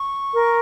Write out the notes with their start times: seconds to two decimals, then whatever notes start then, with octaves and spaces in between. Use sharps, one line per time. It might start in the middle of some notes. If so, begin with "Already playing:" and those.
Already playing: C#6
0.33 A#4